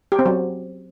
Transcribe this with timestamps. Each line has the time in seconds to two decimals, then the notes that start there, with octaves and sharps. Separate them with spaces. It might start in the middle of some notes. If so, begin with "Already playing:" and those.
0.12 G4
0.19 C4
0.26 F#3